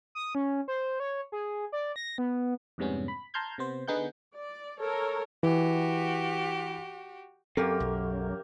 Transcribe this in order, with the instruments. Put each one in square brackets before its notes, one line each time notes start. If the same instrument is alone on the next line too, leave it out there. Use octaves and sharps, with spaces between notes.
[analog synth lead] D#6
C#4
C5
C#5
G#4
D5
A#6
B3
[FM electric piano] F2 G#2 C3 G3 B3 C#4
B5
A5 A#5 C6 F6 G6 G#6
C3 B3 C5
D3 B3 D#4 G#4 F#5 G6
[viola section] D5
A4 A#4 C#5
[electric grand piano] E3 [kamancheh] F#4 G4
[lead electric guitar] F#2 [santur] A#3 G4 A#4 [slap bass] C4 [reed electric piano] A4
[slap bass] B1